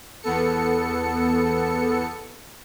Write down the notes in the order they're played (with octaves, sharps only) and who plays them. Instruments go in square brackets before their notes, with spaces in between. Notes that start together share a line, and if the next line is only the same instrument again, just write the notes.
[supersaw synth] E2 B3 A4 C#7